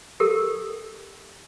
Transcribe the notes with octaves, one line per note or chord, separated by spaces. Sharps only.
G4 A4 A#4